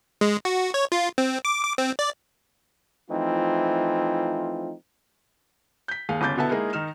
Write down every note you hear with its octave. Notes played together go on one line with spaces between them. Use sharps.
G#3
F#4
C#5
F4
C4
D6
D6
C4
D5
E3 F3 A3 C4 D#4 F4
G6 B6
D#2 G#4 F5
G1 C#3 D6 G6 A6
B2 D3 B3 E4 E5 A5
G#3 A#3 D#4 E4 G#4 A#4
D#3 D#4 F6 E7